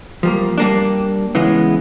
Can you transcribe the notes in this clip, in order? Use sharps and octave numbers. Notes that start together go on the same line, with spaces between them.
F3 G3 A#3
G3 A#3 D4
C#3 E3 G#3 B3